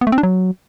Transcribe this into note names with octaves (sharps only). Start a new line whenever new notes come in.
B3
A3
C4
D4
F#3